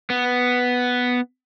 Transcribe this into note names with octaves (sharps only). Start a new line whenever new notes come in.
B3